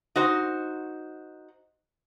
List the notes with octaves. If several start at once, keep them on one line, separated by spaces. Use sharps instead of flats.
D#4 F#4 C5